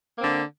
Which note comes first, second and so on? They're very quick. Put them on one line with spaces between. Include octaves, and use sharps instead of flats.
A#3 C4 D3